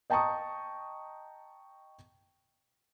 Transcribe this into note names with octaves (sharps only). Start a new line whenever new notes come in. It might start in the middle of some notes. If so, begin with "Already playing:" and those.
D#5 G5 A5 A#5 C#6 D#6